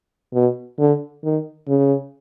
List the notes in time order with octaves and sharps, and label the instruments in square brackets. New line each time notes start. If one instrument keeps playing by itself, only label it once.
[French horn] B2
D3
D#3
C#3